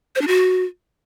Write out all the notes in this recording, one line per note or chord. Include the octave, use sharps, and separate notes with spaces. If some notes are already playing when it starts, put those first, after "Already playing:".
C5
D4
F#4